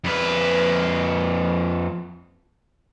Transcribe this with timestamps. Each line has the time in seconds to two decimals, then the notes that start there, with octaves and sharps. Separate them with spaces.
0.04 F2 B4